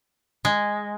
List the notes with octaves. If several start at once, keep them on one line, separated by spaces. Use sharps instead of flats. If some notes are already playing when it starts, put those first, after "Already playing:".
G#3